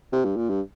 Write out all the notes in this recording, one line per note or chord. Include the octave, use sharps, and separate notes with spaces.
C3
G2
A#2
G2